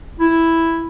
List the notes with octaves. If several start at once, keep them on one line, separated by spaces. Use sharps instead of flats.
E4